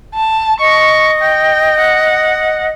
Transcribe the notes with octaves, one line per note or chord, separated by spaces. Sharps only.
A5
D#5 C#6
G5
F#5